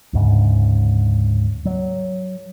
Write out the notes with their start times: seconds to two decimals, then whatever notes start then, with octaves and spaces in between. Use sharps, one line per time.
0.13 D2 G#2 C#3
1.65 F#3